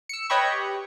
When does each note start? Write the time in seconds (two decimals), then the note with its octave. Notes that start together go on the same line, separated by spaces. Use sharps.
0.09 E6 C#7
0.30 B4 C#5 D#5 G5 B5 C#6
0.52 G4